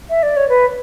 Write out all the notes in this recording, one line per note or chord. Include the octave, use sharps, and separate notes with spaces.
E5
D5
C#5
B4